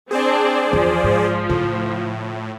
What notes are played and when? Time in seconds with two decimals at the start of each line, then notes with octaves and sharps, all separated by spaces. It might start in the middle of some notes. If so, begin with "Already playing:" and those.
0.11 C4 D4 G#4 C5 D5
0.73 E2 F3
1.04 G#2
1.49 A2 C#3 F4